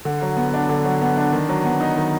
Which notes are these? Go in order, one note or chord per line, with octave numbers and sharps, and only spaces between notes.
D3
F#3
B3
D4
D3
F#3
B3
D4
D#3
F#3
B3
D#4
D#3